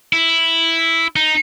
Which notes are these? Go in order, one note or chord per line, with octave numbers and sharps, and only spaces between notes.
E4
D#4